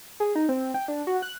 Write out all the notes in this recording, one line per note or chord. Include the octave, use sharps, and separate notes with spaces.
G#4
D#4
C4
G5
D4
F#4
F#6